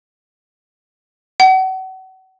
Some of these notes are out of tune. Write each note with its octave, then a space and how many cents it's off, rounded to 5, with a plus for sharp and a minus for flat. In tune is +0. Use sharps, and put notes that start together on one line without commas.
F#5 +35